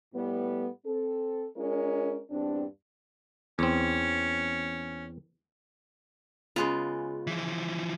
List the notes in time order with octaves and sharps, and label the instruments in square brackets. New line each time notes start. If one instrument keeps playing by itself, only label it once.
[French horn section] A2 G3 A3 B3
C4 A4
G#3 C#4 D4 F4 A#4
E2 G2 C4 D4
[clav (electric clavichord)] E2 C4 [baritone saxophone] C#4
[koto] C#3 G#3 B3 [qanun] F4
[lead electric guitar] E3 F3